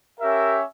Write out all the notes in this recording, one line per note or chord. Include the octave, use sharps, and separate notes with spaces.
C#4 G4 A#4 E5